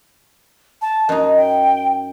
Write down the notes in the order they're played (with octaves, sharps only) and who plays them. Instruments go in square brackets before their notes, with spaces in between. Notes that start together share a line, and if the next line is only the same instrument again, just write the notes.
[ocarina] A5
[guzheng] F#2 D#4 [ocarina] D#5
[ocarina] G5